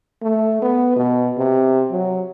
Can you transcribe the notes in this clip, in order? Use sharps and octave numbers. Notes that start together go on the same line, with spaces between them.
A3
B3
B2
C3
F#3